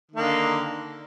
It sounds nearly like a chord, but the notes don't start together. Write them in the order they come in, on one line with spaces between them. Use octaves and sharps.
D#3 A#3 D3